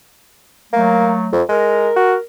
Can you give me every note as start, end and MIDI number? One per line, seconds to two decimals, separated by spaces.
0.73 1.30 54
0.73 1.30 57
0.73 1.15 58
1.32 1.43 41
1.49 1.90 56
1.49 2.20 70
1.96 2.15 66